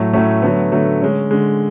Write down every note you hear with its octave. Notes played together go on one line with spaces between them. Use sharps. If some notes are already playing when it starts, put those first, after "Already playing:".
Already playing: A2 F#3 A3
A2 F#3 A3 C#4
D3 F#3 A3 B3
D3 F#3 A3
D3 G#3 C#4
D3 G#3